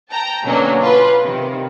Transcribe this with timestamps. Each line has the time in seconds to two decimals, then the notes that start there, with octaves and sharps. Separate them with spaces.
0.12 G5 A5 A#5
0.44 B2 D3 F#3 A#3 C#4 D4
0.82 F4 B4
1.22 C3 D#3